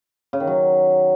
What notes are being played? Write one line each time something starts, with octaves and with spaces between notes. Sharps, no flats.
C#3
D#3
F#3